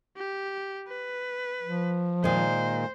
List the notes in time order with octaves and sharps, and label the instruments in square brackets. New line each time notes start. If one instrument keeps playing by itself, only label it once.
[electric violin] G4
B4
[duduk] F3
[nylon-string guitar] A#2 D#3 G#3 [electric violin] C5